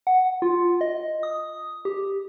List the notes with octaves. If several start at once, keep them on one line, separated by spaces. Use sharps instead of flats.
F#5
F4
D#5
D#6
G4